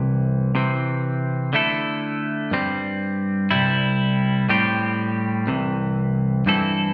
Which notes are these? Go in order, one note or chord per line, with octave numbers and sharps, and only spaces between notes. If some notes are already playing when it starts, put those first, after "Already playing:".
Already playing: C2 C3 E3
C3 E3 C4
D3 A3 E4 A4
G2 G3 C4
C2 C3 G3 E4
A2 G3 C4 G4
C2 C3 E3
G2 E3 C4 E4 A4